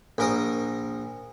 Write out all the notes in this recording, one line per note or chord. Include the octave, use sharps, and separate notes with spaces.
A#1 A#4 D#6